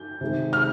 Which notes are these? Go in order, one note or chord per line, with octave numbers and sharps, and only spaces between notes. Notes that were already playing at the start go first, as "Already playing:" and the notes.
Already playing: G6
C3 D#3 G#3
F6